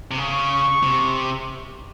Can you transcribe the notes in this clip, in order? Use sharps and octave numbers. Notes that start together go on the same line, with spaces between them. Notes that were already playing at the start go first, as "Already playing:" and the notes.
C3
C#3 C#6
C3